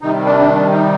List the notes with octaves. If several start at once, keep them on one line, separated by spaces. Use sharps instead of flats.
C3 D#3 G3 D#4
D4
D#4